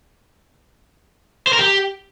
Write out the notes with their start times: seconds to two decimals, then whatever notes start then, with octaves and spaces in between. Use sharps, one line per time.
1.47 C5
1.53 A#4
1.59 G4